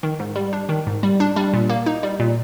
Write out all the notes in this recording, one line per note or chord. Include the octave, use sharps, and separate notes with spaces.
D#3
G#2
G3
D4
D#3
G#2
G3
D4
G3
A#2
A#3
D#4
G3
A#2